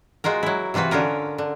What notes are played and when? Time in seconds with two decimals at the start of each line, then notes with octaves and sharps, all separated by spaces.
0.24 G#3 F4 F#4 A#4
0.43 F#3 E4
0.74 C3 E3 F4 F#4 B4
0.91 D3 C#4 F4 A#4
1.38 D3